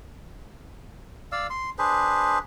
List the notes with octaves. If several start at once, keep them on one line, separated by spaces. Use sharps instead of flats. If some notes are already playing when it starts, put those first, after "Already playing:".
D5 F5 E6
C6
D4 G#4 B4 C5